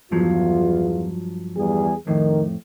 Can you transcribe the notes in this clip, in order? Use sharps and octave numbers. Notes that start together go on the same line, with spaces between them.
E2 G2 F3 F#3 F4
E2 G3 G#4
F2 A2 D#3